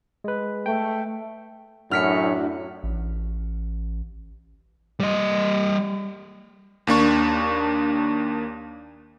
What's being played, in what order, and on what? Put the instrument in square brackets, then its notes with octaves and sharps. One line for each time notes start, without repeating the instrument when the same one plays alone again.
[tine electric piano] G#3 B4
[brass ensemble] A3 [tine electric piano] G5
[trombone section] F#2 A2 [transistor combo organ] D4 E4 F#4 [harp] F6 B6 C#7
[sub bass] A1
[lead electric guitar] G3 D#5
[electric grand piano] D#2 A#3 D4 C#6